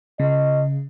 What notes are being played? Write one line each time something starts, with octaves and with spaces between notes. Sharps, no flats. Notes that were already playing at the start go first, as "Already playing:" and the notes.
C#3 D#5